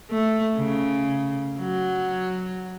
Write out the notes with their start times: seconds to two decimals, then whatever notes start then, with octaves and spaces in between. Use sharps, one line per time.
0.11 A3
0.58 C#3
1.60 F#3